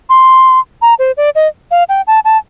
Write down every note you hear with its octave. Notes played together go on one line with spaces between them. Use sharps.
C6
A#5
C5
D5
D#5
F5
G5
A5
A5